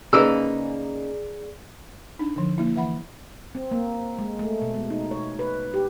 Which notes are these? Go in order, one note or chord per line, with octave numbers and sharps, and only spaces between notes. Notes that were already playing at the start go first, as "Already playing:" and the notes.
C#3 A#3 D#4 G#4 B4 D5 E6
D4 D#4
D3 F3
A#3 E4
E3 E5 F#5 B5
C4
A#3
G#3
A3
B2
G#3
D#4
C#5
B4
G4